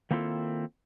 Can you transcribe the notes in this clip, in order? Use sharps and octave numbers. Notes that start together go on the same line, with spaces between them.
D#3 A#3 C4 E4 F4 A4